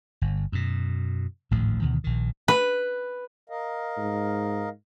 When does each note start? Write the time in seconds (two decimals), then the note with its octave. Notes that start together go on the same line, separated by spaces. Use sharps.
0.21 G1
0.52 F#2 B2
1.51 G#1 D2 A2 F3
1.80 D2 B2 D#3 E3
2.04 A#1 D#3
2.48 B4
3.50 A#4 D#5 F5
3.97 G#2